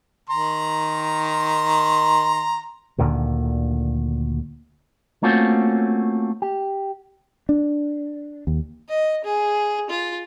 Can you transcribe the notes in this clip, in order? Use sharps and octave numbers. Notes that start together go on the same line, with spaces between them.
D#3 A#5 C6
D2 A#2 D3 D#3
A3 A#3 C4 C#4 F4 F#4
G4
D4
D#2
D#5
G#4
F4